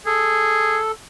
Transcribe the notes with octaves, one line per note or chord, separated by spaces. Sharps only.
G#4 A4